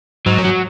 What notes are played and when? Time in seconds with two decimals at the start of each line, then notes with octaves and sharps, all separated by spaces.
0.26 G#2 F#3
0.38 F#2
0.45 F#3